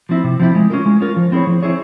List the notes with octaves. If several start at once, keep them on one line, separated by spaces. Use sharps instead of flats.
F3 C4 E4
C3
F3 C4 E4
G#3
C#4 F4 A#4
G#3
C#4 F4 A#4
F3
C4 E4 G#4 C#5
F3
C4 E4 G#4 C#5